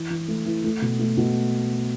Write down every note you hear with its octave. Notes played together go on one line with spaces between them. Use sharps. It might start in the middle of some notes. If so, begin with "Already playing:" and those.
Already playing: E3
E3
A3
E3
A3
B2
A3
B2